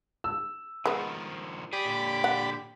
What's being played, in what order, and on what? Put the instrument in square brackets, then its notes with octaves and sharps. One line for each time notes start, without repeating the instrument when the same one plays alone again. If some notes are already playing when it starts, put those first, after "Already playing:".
[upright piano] E6
[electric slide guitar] D#3 F3 [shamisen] G#3 B3
[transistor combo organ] G4 D5 B5 [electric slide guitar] G#4
[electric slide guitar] A#2 D3
[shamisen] F#5